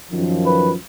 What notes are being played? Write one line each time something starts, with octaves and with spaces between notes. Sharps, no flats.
F#2 D#3 F3
B4